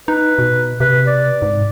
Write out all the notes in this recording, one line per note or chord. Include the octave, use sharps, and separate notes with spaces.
D#4 B4
B2
C3 B4
D5
G#2